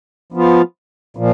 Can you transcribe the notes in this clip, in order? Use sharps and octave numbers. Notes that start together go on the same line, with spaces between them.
F3 B3 F4
A#2 F3